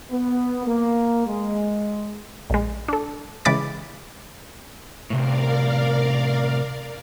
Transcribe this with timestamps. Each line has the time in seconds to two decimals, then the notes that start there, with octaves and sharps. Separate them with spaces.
0.10 B3
0.64 A#3
1.27 G#3
2.50 A#1 G#3
2.88 D4 A4
3.45 C#3 E3 G#3 B5 D6 A6
5.10 A2 C3 A#4 D5 F5